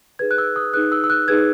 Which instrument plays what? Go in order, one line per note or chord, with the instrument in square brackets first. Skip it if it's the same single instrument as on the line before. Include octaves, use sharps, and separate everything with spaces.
[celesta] D#4 G#4 B4 G#6
F#6
E6
D#6
D#4 G#4 B4 F#6
E6
E6
F#6
D#4 G#4 B4 G#6